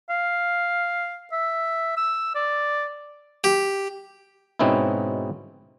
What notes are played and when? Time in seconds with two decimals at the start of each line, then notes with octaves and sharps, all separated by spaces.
0.10 F5
1.32 E5
1.97 E6
2.35 D5
3.44 G4
4.59 G#2 B2 C4 C#4 D#4 E4